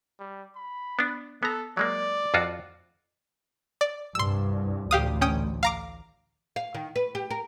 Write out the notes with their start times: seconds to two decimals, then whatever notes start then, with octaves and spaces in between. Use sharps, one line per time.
0.20 G3
0.56 B5
0.99 B3 D4
1.43 B3 A4 A#5
1.77 F#3 G#3 A#3 D5
2.34 F2 F4 F#4
3.81 D5
4.15 C2 G2 C6 E6
4.91 A1 D2 G4 F5 D#6
5.21 C#4 G5 D#6
5.63 F5 A#5 D6
6.56 F5
6.75 D#3
6.96 B4
7.15 G4
7.31 A#4